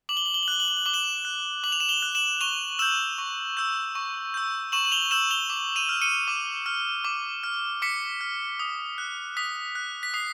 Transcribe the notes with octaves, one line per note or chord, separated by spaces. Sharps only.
D6 F#7
G7
F#7
G7
F#7
F#6 G7
F#7
G7
F#7
D6 G7
E7 F#7
F#6
D6 F#7
F7
E7 F#7
F7 G7
F#6
E7 F#7
C#6 F7 G7
E6 G6 E7 F#7
C#6
E6 G6
C#6
E6 G6
C#6 E7 F#7
F#7
F7 G7
E6 G6 E7 F#7
F7 G7
D6
D#7 F7
F6
C#7 D#7
D6
F6
D6
F6
D6 B6 C#7
F6
D#6
F#6
D#6 B6
F#6
B6
D#6 C7